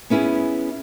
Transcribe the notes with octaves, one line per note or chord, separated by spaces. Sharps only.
B3 C#4 E4 G#4